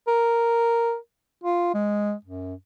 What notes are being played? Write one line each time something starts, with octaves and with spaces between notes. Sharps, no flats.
A#4
F4
G#3
F#2